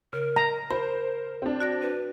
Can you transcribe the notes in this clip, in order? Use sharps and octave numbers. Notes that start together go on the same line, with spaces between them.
C#3 A#4
A#5
A#4 C5 B5
C4 D4
F#4 D5 A#6
B4